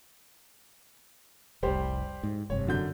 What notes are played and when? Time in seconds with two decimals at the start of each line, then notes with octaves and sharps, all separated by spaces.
1.63 F1 C2 G3 G4 C5
2.23 G#2
2.50 F1 G2 C3 C#5
2.67 F#2 D3 G6